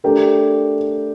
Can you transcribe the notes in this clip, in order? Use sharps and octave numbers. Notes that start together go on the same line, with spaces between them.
A3 D4 G4 A#4